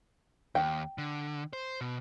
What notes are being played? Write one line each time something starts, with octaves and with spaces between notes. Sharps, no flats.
D#2 G5
D3
C5
B2